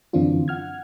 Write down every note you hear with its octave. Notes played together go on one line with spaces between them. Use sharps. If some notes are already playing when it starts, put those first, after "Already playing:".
F#2 D3 E3 C4 D4 F4
F#5 F6 G#6